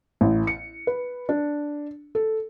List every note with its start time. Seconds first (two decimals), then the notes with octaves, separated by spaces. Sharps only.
0.21 A1
0.47 C#7
0.87 B4
1.29 D4
2.15 A4